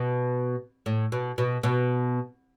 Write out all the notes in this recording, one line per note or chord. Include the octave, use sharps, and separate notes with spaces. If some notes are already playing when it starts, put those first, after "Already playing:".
Already playing: B2
A2
B2
B2
B2